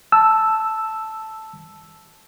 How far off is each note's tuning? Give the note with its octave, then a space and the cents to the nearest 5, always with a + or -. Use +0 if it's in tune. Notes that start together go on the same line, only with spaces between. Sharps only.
A5 +0 E6 +0